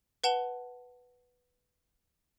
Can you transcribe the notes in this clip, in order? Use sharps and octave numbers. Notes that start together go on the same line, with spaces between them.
B4 F#5 A5 G7